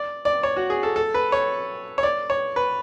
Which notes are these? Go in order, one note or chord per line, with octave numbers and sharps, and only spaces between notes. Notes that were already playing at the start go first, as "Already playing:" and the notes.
Already playing: D5
D5
C#5
F#4
G#4
A4
A4
B4
C#5
C#5
D5
C#5
B4